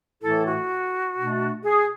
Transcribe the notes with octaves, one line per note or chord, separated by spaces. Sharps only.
A2 E3 A3 E4 A4
F#4
B2 A3 D4
G#4